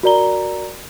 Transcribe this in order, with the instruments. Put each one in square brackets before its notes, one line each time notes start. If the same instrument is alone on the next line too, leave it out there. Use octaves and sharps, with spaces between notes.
[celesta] F#4 A#4 D5 A#5 G7